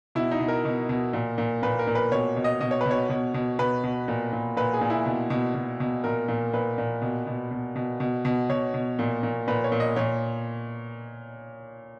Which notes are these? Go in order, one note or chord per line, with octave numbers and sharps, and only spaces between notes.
B2 E4
D#4
B2
A#4
B2
B2
A#2
A#2
A#2 B4
A#4
A#2
B4
B2 C#5
B2
D#5
B2 D#5
C#5
B2 B4
C#5
B2
B2
B2 B4
B2
A#2
A#2
A#2 B4
G#4
A#2
E4
B2
B2
B2
B2
A#2 A#4
A#2
A#2 B4
A#2
B2
B2
B2
B2
B2
B2
B2 C#5
B2
A#2
A#2
A#2 B4
C#5
A#2
D#5
A#2 C#5